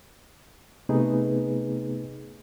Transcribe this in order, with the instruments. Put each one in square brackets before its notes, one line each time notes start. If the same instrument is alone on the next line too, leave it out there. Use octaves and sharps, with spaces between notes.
[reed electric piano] C3 A3 B3 D#4 G#4 B4